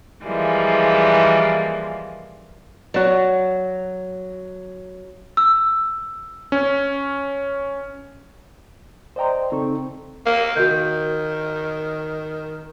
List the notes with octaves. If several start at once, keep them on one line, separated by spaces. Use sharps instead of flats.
E3 F3 G3 G#3 A#3
F#3 F#4 D5
E6
C#4
C5 D5 D#5 G5 A#5 C6
C#3 C4 D#4 A4 C#6
A#3
D#3 F#4 A#4 G6